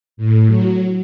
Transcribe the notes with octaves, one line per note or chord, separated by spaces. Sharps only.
A2
F#3